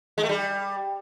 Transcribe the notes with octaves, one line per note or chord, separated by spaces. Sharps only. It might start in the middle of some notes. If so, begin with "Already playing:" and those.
G#3
A3
G3